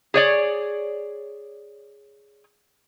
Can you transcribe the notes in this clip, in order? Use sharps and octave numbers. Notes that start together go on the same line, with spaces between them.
G#4 C#5 D5